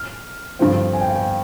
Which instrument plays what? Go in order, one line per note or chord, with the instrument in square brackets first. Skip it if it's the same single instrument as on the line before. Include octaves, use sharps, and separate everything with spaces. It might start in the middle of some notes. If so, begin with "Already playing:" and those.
Already playing: [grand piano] F6
[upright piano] G2 D3 F3 C4
[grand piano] G#5
G5
F5
G5